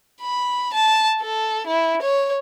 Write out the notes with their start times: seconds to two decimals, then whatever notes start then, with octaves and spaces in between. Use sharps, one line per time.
0.21 B5
0.73 A5
1.21 A4
1.67 E4
2.02 C#5